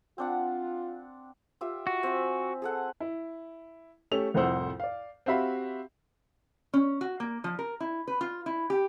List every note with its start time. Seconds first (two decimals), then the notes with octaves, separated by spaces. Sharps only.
0.18 C4 D4 F4 F#5
1.61 F4 G4 E5
1.87 F#4
2.03 C4 E5 G#5
2.62 G#4 A4 F#5
3.00 E4
4.11 A3 C#4 G4 E6 F7
4.34 C2 F2 A2 C5 F#5 E6
4.80 D5 F5
5.26 C4 F#4 G4 E5 F5 B5
6.74 C#4
7.01 F#4
7.20 A#3
7.44 F3
7.59 A#4
7.80 E4
8.08 B4
8.21 F4
8.46 E4
8.70 G4